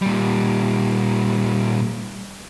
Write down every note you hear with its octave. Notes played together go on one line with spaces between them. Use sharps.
A#2 G3